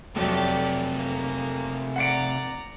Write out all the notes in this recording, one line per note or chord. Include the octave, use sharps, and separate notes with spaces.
F2 C3 F#3 A3 G4 D5
A#3
D5 F#5 A#5 C#7 D7